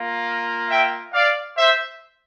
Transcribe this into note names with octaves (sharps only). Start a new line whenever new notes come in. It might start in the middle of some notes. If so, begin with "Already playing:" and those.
Already playing: A#3 F4
E5 G5
D5 F5
C5 E5